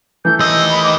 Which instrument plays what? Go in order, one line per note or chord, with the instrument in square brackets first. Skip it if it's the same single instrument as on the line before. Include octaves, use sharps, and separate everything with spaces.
[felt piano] E3 A3 A4 [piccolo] G6
[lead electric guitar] D#2 D#5 [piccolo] E6
[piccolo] B5
D6